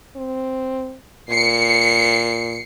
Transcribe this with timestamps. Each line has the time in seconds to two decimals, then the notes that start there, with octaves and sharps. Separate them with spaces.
0.16 C4
1.29 A#2 C7 C#7